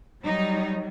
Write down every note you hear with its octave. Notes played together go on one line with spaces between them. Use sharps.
F#3 G3 D#4